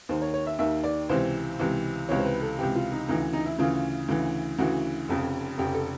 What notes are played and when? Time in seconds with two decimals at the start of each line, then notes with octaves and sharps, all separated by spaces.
0.09 D#2 D#3 C5
0.22 C#5
0.34 C#5
0.47 E5
0.59 D#2 D#3 E5
0.84 D5
1.09 C#2 C3 E3 C5
1.59 C#2 C3 E3
2.09 C#2 C3 E3 C#5
2.19 C5
2.25 B4
2.42 A4
2.59 C#2 C3 E3 G4
2.75 F4
2.92 D#4
3.09 D2 C#3 E3 D#4
3.33 D#4
3.46 E4
3.58 D2 C#3 E3 F4
4.08 D2 C#3 E3
4.58 D2 C#3 E3 F#4
5.09 F1 F2 C#3
5.58 F1 F2 C#3 G4
5.75 A4